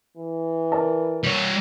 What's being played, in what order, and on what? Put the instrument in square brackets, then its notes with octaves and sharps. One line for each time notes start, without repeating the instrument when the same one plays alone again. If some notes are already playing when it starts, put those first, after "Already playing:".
[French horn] E3
[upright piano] A#4 D5 A5
[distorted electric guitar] G3 C#5